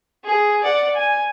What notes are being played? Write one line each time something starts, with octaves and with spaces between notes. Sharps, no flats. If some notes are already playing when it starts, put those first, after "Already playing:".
G#4
D5 F#5
G#5